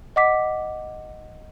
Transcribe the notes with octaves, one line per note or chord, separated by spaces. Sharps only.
D#5 F#5 D6 B6